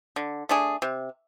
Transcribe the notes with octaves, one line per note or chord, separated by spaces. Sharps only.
D3
A3 D4 G#4
C3